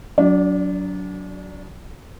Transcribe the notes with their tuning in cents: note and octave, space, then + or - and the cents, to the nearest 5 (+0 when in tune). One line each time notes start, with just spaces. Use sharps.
F#3 +0 D4 -35 D5 +5